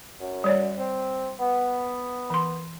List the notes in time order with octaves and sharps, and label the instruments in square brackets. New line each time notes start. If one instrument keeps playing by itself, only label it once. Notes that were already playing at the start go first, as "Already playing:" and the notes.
[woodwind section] F#2
[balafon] G3 C#5 D5
[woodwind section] C4
B3
[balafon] E3 C6